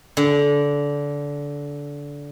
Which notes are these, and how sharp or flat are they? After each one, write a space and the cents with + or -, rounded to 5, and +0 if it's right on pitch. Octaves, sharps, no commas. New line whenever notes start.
D3 -20